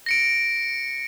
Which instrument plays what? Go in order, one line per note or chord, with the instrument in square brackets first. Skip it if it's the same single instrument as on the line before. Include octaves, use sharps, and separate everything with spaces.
[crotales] A#6 C#7 D7